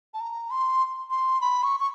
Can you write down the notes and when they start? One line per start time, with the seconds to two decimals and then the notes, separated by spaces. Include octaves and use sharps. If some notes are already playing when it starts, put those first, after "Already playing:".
0.14 A5
0.20 A#5
0.50 C6
1.10 C6
1.41 B5
1.63 C#6
1.80 C#6